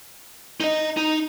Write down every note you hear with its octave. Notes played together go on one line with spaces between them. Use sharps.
D#4 D#5
D#4